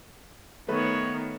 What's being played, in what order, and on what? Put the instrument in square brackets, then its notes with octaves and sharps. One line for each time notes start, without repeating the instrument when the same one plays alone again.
[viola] D#3 B3 [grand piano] A3 B4 [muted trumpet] C#5